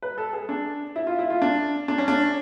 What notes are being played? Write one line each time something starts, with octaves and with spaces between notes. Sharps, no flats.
B4
A4
G#4
D4
E4
F4
E4
F4
D4
D4
C#4
D4